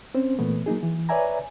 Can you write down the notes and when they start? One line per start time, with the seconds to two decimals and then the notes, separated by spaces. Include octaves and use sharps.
0.15 C4 C#4 C5
0.39 A#2 E3 A3 B3
0.66 F#3 A#3 D#4 G#4
0.83 E3
1.09 B4 C#5 D5 E5 G#5 A#5